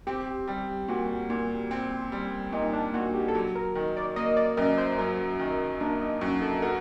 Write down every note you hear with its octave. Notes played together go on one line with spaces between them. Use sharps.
C4 G4
G3
A#2 F#4
A#2
C4
G3
A#2 D#4
D4
A#2 F#4
G4
A4
F#3 G4
A#4
D#3
D5
A#3 D#5
D5
F#2 A#4
C5
C5
F#3 A#4
D#3
A#3 D4
D#4
F#2 F#4
A4
F#4 A#4